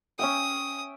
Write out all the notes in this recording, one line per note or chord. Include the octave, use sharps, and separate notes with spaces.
C#4 E5 G5 D#6